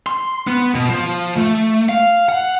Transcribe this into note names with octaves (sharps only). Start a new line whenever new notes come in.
C6
B3
B2
F3
A3
F5
F#5